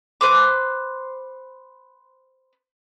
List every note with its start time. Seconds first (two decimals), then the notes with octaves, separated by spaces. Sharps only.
0.21 B4 C5 D6